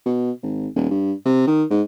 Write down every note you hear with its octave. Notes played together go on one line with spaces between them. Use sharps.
B2
G#1
D#1
G2
C3
D#3
G#2